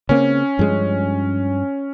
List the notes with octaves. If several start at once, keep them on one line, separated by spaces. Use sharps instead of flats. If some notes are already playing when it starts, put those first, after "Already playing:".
C#3 A#3 C4 C#4
G2 F3 G#3